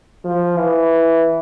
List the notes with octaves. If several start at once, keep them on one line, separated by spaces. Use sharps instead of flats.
F3
E3